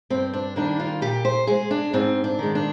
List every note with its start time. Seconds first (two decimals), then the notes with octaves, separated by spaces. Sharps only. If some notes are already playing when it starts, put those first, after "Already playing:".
0.10 G2 C4
0.33 D4
0.56 D#3 G3 A#3 D4
0.80 F4
1.02 A#2 G4
1.25 C5
1.47 G#3 G#4
1.71 D4
1.93 G#2 C4
2.24 D4
2.39 D#3 G#3
2.55 D4